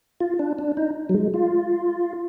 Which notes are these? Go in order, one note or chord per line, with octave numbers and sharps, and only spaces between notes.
F4
D4
D4
D#4
F#3
G#3
F4